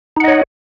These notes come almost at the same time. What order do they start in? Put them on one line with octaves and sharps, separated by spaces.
D#4 F#5 D#5 C#5